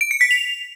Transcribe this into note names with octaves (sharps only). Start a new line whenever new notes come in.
D7
C#7
B6
F7